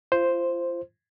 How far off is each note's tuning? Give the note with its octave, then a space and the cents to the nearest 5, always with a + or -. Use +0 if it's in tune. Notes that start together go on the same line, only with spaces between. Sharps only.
F4 -30 C5 +0